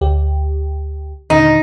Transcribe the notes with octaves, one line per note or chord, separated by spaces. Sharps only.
D2 G4
D#2 A#2 D3 D#4